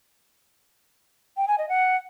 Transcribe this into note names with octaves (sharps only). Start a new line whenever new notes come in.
G5
G#5
D#5
F#5